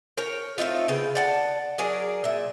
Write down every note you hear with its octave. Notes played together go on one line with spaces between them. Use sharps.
A#4 C#5 G5
A3 C4 D#4 F4
C#3 B3 G5
D5 F#5 A5
F#3 G#4 A#4 D5
A#2 E5